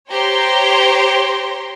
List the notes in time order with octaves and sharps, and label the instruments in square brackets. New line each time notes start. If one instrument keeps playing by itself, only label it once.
[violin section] G4 C5 C#5 G5 A#5 C6